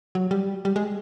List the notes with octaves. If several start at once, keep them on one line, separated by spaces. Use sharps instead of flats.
F#3
G3
G3
G#3